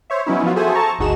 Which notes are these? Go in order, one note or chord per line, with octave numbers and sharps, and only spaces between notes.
C5 C#5 E5
F#3 B3 C#4 D#4 E4
F3 F#3 B3 F4 F#4
F#4 G#4 A4 C5 E5 G#5
A4 A5 A#5 C#6
G1 D2 D#4 F#4 G#4 E7